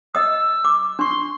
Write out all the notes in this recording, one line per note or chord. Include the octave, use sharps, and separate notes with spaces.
D#5 D#6 E6
D6
D4 C6 C#6